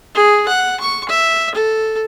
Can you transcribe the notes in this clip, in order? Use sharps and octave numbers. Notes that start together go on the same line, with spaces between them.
G#4
F#5
C#6
E5
A4